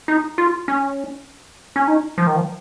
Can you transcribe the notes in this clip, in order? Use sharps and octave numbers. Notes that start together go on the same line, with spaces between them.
D#4
F4
C#4
C#4
D#4
F3
D#3
F3